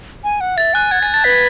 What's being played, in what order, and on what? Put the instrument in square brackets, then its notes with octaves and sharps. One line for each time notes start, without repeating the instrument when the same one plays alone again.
[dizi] G#5
F#5
[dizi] E5 [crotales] A6
[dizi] G#5 [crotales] F#6
[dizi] F#5 [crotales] G#6
[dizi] G#5 [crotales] A6
[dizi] A5 [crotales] A6
[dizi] B4 [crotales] B6